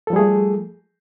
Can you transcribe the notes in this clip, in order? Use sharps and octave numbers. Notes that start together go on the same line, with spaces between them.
F3 G3 A3 G#4 A4